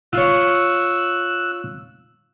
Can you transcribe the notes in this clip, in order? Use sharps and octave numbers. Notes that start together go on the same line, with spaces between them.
F4 C#5 E6 F#6